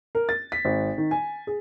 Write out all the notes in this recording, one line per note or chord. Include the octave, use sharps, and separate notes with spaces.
A#4
A6
B6
G#1
D#3
G#5
G#4